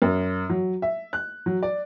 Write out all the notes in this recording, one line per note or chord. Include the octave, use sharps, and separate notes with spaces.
F#2
F#3
E5
F#6
F#3
D5